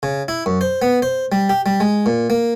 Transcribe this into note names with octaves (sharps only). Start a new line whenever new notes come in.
C#3
E4
F#2
C5
B3
C5
G3
G4
G3
G#3
A#2
A#3